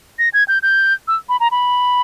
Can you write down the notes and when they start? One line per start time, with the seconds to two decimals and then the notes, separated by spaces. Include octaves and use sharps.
0.19 A#6
0.34 G#6
0.48 G6
0.63 G6
1.08 E6
1.29 B5
1.40 A#5
1.51 B5